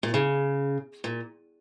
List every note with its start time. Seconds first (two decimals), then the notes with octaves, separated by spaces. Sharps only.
0.03 A#2
0.14 C#3
1.04 A#2